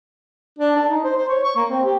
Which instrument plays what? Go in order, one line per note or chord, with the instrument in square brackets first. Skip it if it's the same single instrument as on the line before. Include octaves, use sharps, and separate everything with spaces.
[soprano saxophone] D4
A5
D#4
C5
C5
C#5
C#6
A#3
C4
G4